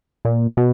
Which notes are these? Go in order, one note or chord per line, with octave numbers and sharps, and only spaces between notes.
A#2
B2